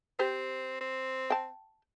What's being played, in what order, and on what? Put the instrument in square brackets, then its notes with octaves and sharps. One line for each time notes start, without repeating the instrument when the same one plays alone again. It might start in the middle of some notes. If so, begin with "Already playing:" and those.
[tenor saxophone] C4 [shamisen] G4 C5
[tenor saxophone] C4
[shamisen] G5 A5